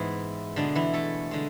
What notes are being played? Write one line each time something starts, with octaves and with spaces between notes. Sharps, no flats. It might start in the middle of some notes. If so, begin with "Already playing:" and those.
Already playing: G#2 E3 G#3 B3 E4
B2 D3 G#3 B3 D4
E3 E4
A3 A4
D3 G#3